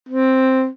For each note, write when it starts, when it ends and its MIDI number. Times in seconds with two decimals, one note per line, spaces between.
0.09 0.67 60